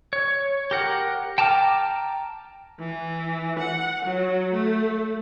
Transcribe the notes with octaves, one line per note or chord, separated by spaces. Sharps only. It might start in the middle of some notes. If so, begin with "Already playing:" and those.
C#5
G4 A#4 F#5
G5 A5 A#5 D6 F6
E3
F#5
F#3
A3